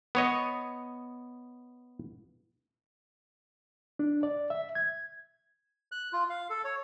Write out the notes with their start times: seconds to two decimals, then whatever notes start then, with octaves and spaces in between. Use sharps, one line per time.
0.15 B3 C#5 D#5
3.99 D4
4.23 D5
4.50 E5
4.75 G#6
5.92 F#6
6.13 F4
6.30 F5
6.50 A4
6.64 C#5